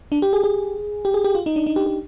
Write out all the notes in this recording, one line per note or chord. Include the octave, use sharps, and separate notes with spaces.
D4
G4
G#4
G#4
G4
G#4
G4
F4
D#4
D4
D#4
G4
G4